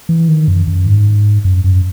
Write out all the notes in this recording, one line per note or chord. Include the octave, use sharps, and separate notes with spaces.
E3
D#3
F#2
F#2
G#2
F#2
F#2